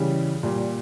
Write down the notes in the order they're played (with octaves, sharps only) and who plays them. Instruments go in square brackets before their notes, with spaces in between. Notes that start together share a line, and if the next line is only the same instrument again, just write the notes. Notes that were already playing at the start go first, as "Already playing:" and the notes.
Already playing: [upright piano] C#3 E3 G3
A#2 G3